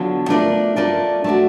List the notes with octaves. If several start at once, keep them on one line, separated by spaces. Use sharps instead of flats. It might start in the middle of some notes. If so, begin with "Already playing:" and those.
Already playing: D3 F#3 B3 D4 F4
A3 D4 F4 A#4 D5
A3 D4 F4 A#4 D5
A3 D4 F#4